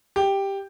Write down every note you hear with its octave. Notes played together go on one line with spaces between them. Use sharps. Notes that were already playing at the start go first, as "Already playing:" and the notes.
G4